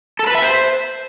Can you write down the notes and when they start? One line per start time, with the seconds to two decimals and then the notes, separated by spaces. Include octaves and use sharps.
0.19 A4
0.27 B4
0.35 E5
0.42 C5